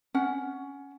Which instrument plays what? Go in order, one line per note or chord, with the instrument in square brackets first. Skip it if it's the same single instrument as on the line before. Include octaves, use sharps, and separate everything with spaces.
[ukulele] C#4 F#5